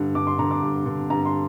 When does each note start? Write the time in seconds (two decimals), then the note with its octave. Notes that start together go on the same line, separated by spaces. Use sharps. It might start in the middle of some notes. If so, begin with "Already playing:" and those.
Already playing: G2 D3
0.15 G2 D6
0.27 C6
0.39 D3 A#5
0.51 D6
0.63 G2
0.86 D3
1.10 G2 A#5
1.25 C6